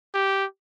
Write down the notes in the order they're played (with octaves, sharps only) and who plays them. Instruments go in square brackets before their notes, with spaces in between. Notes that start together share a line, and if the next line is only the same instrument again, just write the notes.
[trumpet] G4